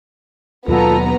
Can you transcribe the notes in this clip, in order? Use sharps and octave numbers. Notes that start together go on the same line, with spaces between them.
D#2 B2 F#3 B3 F4 A4 A#5